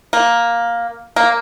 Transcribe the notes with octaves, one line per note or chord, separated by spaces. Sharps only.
A#3
A#3